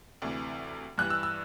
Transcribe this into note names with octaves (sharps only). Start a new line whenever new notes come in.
D2 C3 E3
G2 E3 G3 F#6
E6
E6